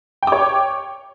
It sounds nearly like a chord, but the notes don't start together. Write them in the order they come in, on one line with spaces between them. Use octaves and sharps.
G5 D6 C#5